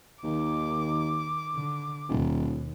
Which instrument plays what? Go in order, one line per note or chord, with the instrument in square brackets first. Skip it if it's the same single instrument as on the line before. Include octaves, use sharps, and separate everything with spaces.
[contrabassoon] D#2 [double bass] D#3 [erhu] D6
[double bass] D3
[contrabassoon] D#1 [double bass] D#2 B2